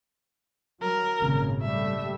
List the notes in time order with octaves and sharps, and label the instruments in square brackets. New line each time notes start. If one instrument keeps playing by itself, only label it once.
[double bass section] F#3 [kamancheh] A#4
[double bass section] G#1 A#2 C#3
[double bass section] G3 A3 [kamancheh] E5